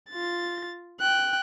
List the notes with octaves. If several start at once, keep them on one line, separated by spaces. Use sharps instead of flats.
F4 A6
G5 F#6